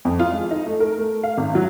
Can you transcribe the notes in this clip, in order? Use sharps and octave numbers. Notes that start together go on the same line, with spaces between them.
F2
F4
G#3
D#4
A3
A#4
A3
F5
G#1
F#3